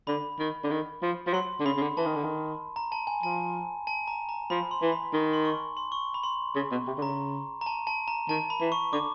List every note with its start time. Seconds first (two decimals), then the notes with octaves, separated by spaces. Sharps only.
0.07 D3 B5
0.39 D#3
0.64 D3
0.71 D#3
1.02 F3
1.27 F3
1.33 F#3 C6
1.60 D3
1.66 C#3 B5
1.77 C#3
1.82 D3
1.97 E3 A5
2.06 D#3
2.16 D3
2.24 D#3
2.76 A#5
2.92 A5
3.07 G#5
3.23 F3 A5
3.87 A5
4.08 A#5
4.29 A#5
4.50 F3 B5
4.71 C6
4.82 E3
4.92 B5
5.13 D#3
5.33 C6
5.45 C#6
5.77 C6
5.92 C#6
6.14 B5
6.24 C6
6.55 C#3
6.71 B2
6.87 C3
6.98 D3
7.02 C#3 A#5
7.61 A#5
7.66 A5
7.87 A5
8.08 A#5
8.29 D#3 A5
8.50 B5
8.61 E3
8.72 C#6
8.93 D3 D6